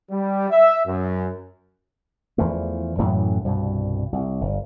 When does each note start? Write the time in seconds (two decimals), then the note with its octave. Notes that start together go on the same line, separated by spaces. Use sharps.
0.10 G3
0.50 E5
0.86 F#2
2.38 E2 E3 F3 A3
2.99 F#2 A2 E3 F#3
3.45 C2 G2 B2
4.12 C2
4.41 G1